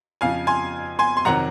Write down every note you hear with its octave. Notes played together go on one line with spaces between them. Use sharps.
F2 C#3 F3 F5 G#5
G#5 C6
G#5 C6
C6
F2 C3 D#3 F#3 F#5 A#5